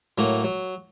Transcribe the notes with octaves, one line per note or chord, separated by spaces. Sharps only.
A2 F#3 A#3
F#3